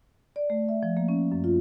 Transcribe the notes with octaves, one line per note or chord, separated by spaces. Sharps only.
D5
A3
E5
F3
A#3
C#4
F#2
F4